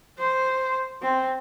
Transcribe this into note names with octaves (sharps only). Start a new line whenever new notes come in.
C5
C4